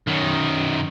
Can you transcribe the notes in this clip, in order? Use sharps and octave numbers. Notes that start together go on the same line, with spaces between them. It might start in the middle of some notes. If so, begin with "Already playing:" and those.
F#2 D#3